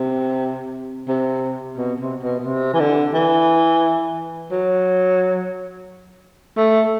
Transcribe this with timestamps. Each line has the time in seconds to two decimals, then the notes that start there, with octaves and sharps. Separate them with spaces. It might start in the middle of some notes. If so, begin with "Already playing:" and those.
Already playing: C3
1.09 C3
1.77 B2
2.00 C3
2.22 B2
2.40 B2
2.45 C3
2.73 E3
2.80 D3
3.14 E3
4.51 F#3
6.57 A3